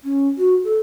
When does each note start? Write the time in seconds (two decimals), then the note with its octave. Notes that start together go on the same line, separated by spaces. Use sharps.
0.04 C#4
0.38 F#4
0.64 A4